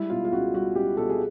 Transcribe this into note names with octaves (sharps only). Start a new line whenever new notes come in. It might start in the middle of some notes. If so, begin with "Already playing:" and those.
Already playing: G3 G#3 E4
B2 F4
F4
C#2 F#4
G3 F#4
C#2 G4
B2 A4
G#4